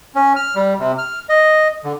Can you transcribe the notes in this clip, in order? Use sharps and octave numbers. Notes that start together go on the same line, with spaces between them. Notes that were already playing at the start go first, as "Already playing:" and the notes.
C#4
F6
G3
C3
F6
D#5
D3